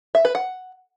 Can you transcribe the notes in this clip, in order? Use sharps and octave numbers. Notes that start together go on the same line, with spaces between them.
E5
B4
F#5